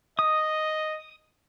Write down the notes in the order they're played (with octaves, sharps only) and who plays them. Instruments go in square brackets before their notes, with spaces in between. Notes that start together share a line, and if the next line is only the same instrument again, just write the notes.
[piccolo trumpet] D#5 [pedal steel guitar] D#6